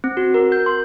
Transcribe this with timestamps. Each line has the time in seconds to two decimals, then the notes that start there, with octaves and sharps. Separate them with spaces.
0.04 C4
0.17 F#4
0.34 A#4
0.52 G6
0.66 C6